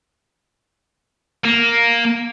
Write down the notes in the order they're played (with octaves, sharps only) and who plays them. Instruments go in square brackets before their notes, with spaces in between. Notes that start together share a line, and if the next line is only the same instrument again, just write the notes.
[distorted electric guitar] A#3